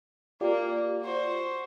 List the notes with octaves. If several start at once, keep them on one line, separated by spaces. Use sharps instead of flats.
A#3 F4 G4 D5
F#4 C5